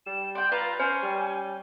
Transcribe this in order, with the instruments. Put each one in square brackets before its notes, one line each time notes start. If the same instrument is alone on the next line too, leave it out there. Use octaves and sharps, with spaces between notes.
[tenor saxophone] G3 [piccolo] E7
[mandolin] D5 G5 [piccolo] C6
[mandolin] F4 [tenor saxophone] B4 [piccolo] A#5
[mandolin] C#4 [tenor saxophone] C5 [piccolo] G#5
[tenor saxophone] G3